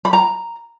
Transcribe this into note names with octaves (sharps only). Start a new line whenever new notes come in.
B5
A#5